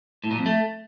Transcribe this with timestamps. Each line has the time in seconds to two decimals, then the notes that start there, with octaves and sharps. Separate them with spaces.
0.24 A2
0.31 A#2
0.38 F2
0.46 A3